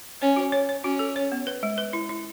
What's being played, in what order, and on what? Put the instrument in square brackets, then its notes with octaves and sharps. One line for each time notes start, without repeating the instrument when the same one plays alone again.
[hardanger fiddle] C#4 [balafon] C#5
[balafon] F#4
C#5
C#5
[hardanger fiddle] C#4 [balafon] F#4
[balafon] A4
C#5
B3
B4
G#3
B4
E4
E4